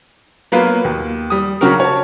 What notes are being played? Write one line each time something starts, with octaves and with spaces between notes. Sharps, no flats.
F#3 A#3 B3 F4 B4
D#2
G3 D#6
C#3 F#3 F#4 G4 A#4
C#5 A5